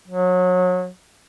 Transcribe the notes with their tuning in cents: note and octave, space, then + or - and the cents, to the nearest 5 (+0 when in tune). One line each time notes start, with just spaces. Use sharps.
F#3 -30